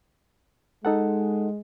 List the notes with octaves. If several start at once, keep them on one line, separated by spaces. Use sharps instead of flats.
G#3 D#4 A4 F#5